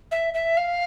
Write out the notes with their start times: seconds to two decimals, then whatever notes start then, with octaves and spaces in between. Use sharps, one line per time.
0.11 E5
0.34 E5
0.57 F5